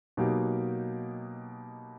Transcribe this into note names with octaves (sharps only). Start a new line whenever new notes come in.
B2 F#3 A#3 D#4 G4